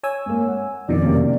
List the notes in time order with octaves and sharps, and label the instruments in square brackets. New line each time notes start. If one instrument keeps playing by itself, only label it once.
[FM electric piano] C#5 G#5 E6
[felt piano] G#2 A#3
F#5
[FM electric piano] F2 B2 D#3 [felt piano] D#4 [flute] D5
[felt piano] C3 A#3 C#4